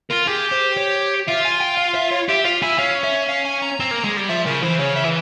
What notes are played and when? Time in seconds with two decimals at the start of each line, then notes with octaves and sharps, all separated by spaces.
0.10 F4 A#4
0.27 G4 G#4
0.52 C5
0.77 C#5
1.28 F4 E5
1.45 G#5
1.61 G5
1.78 F5
1.95 E5
2.11 C#5
2.29 G4 E5
2.45 F4 F5
2.62 E4 G#5
2.78 C#4 F5
3.04 E5
3.29 F5
3.45 G#5
3.62 A#5
3.80 C4
3.91 A#3
4.04 G#3
4.17 G3
4.29 F3 E5
4.46 C#3 A#4
4.62 E3 C5
4.79 C#3 C#5
4.96 E5
5.04 E3